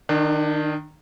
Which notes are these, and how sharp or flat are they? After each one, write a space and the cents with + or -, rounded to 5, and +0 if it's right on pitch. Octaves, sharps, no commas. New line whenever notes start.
D#3 -10 D4 +25